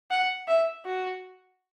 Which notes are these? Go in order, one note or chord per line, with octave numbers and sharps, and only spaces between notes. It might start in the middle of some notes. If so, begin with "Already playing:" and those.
F#5
E5
F#4